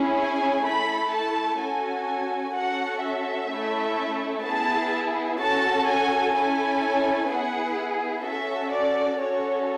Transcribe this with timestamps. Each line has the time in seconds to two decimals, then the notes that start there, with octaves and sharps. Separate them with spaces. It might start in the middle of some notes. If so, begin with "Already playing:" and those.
Already playing: C#4 E4 G#4
0.17 G#5
0.65 A3 E4 A4 B5
1.12 A5
1.60 C#4 F#4 A4 G#5
2.55 C#4 F#4 A4 F#5
3.03 E5
3.50 A3 C#4 E4 A4
4.44 B3 E4 G#4 A5
5.40 C#4 F#4 A4 A5
5.87 G#5
6.35 C#4 E4 A4 G#5
7.29 B3 E4 G#4 F#5
8.24 C#4 F#4 A4 E5
8.73 D5
9.20 C#4 F#4 A4 C#5